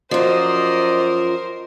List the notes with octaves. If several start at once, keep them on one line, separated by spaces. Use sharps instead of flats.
F#2 F3 A#4 C5 D5 D#5